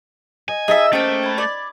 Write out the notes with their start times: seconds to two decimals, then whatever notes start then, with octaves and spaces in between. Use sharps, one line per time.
0.49 D#5 G#5
0.68 D#4 G#4 A4 D#5 E5
0.93 A3 A#3 C#4 C5 G5 D7
1.24 B5 G#6
1.38 D5